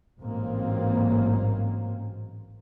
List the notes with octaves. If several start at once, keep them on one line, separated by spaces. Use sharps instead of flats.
A1 G#2 F#3 A#3 C4